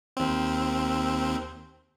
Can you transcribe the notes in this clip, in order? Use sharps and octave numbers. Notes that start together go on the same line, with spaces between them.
D#2 C4